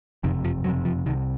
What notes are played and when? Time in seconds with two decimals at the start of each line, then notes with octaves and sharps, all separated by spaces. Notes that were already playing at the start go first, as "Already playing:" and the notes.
0.23 F#1 F2 C3 D#3
0.44 F3
0.64 F#1 F2 C3 F#3
0.85 F3
1.06 C2 C3 D#3